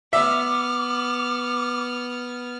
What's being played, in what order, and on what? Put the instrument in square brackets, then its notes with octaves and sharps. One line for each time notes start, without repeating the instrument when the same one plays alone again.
[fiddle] B3 F6 [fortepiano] E5 [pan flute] D6